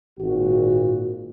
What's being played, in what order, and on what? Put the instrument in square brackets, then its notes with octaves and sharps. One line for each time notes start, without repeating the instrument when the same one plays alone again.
[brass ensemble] G#1 A#2 F#4